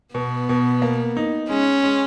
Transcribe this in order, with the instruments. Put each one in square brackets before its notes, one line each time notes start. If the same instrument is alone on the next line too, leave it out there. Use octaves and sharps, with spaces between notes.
[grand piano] B2 [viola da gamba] B3
[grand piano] B2
A#3
D#4
[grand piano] G#3 [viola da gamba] C#4
[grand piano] G#3